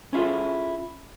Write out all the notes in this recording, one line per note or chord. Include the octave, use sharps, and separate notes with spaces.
C#4 E4 F4 G#4 A4